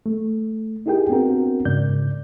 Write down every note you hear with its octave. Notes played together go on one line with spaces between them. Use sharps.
A3
D#4 E4 G4 G#4 A#4 G5
B3 C4 D4 F#4 A#4
G#2 C#3 D5 G6